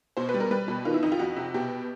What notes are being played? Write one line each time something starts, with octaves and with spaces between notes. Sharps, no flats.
B2 C5
B4
G3
A#4
G3 B4
B2
D#3 F4
E4
F2 D#4
F4
F2 F#4
C3
B2 G4